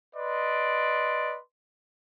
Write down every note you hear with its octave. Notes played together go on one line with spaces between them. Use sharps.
B4 D5 D#5 C6